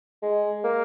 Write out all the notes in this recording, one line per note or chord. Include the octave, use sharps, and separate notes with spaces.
G#3
A#3